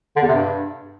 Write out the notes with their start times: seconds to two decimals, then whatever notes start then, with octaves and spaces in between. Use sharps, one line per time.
0.16 D3
0.22 E2
0.28 C3
0.34 G2